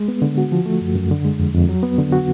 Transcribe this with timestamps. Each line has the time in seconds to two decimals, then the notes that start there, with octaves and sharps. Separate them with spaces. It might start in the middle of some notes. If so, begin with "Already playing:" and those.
Already playing: G#3
0.08 B3
0.22 D3
0.38 F#4
0.52 F3
0.66 A3
0.81 F#2
0.95 F#2
1.11 D3
1.25 G#3
1.40 F2
1.54 F2
1.69 F#3
1.83 B3
1.98 D3
2.13 F#4